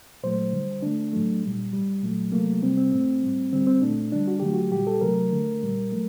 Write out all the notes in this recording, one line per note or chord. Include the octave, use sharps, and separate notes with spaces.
A#2 F#3 A3 C5
D3 G3
D3 A3 D4
A2 F#3 A3
A#2 G3
A2 G3
A#2 F#3 A3
C3 F#3 A3 A#3
C3 G3 C4
C4
A2 A3 C4
A2 G3
D3 G3 C4
C4
A#2 A3 D4
D3 G3 D4
F#4
D3 F#3 A3 G4
F#4
A#2 G3 G4
A4
C3 F#3 A3 A#4
D3 A3
A#2 G3
F#3 A3